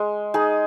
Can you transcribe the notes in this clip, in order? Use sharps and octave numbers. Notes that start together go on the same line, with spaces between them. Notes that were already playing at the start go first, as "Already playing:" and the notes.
Already playing: G#3
D#4 G#4